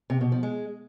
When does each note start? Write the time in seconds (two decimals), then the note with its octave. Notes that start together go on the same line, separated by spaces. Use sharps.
0.10 C3
0.21 B2
0.32 F3
0.43 G#3